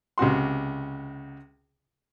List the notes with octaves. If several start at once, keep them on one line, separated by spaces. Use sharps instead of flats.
C#2 C3 F#4 C6